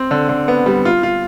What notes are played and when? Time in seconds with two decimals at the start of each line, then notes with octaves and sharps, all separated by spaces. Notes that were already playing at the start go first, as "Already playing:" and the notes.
Already playing: C4
0.11 D3
0.29 D3
0.48 B3
0.66 G3
0.85 F4
1.03 F4